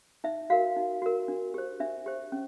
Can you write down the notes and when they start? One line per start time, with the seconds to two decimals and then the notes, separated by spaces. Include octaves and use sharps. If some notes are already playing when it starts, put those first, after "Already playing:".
0.24 D#4 E5
0.50 F#4 A#4 F5
0.76 D#4
1.02 F#4 A#4
1.28 D4
1.54 G4 C5
1.80 D4 E5
2.06 G4 C5
2.32 C#4